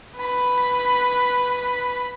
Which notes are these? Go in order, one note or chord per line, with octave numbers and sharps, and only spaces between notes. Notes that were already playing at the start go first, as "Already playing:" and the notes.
B4 B5